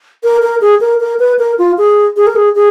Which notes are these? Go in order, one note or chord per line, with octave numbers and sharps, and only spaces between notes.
A#4
A#4
G#4
A#4
A#4
B4
A#4
F4
G#4
G#4
A#4
G#4
G#4